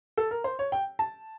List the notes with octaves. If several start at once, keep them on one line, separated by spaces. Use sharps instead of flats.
A4
A#4
C5
C#5
G5
A5